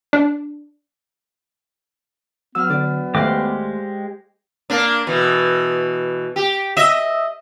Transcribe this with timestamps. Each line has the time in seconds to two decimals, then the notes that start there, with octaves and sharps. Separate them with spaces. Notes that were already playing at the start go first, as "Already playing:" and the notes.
0.13 D4
2.55 F#3 B3 E6 F6
2.70 D3 D5
3.15 D#2 G#3 A3 G4 C5 F5 D6 F#6
4.70 A#3 D4
5.07 B2 E3
6.36 G4
6.77 D#5 E5